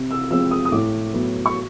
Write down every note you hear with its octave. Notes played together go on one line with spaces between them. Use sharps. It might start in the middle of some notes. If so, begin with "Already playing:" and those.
Already playing: C3
E6
F3 G#3 C4 E6
D#6
D#6
A2 D6
F#3 B3
C#6